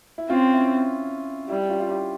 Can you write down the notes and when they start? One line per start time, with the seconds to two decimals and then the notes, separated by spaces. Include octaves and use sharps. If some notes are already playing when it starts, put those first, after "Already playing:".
0.18 E4
0.30 C4 C#4 F4
0.54 E4
0.59 C#4
1.49 G3 E4
1.69 C#4 F4
1.80 F4
1.89 E4 G4